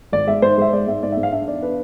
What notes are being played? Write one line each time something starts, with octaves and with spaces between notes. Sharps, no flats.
G#1 D5
G#3 E5
G#2 C5
G#3 E5
G#3 D5
G#2 E5
G#2 D5
E5
G#2
F5
D4 E5
E2 D5
D4 B4